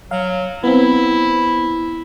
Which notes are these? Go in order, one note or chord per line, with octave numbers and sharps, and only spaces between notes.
F#3 F5
B3 C4 E4